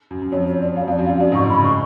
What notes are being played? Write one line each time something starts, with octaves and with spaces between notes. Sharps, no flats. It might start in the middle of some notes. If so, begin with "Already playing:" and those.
F#2
F#2
F2 C#5
C#5
D5
F#2 F5
F2
D5
F#2
F5
F#2
F#2 D5
G#2
C#6
A2
B5
C#3
G#3 C#6